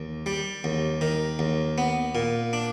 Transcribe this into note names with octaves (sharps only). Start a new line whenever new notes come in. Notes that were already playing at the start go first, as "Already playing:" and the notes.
Already playing: D#2
G3
D#2
D#3
D#2
B3
A#2
D4